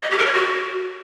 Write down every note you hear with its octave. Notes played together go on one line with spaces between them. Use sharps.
D#5
G4
A#4
C#5
F#4